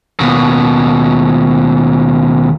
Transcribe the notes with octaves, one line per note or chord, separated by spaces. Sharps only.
D#2 B2